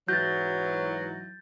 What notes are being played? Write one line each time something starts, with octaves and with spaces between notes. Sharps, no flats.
G#2 E3 F#3 G6 A6